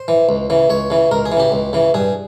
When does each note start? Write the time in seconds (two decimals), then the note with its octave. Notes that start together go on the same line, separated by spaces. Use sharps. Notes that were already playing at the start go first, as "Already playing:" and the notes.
Already playing: C5
0.08 E3
0.29 C#2
0.50 C#3 E3
0.70 C#2 C#5
0.90 C#3 E3
1.11 C#2 A#4
1.26 G#4
1.32 E3
1.37 C#3 G4
1.52 C#2
1.73 C#3 E3
1.94 G2 G#4